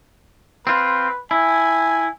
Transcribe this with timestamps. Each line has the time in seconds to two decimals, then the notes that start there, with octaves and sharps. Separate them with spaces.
0.67 C4 F4 B4
1.31 E4 G#5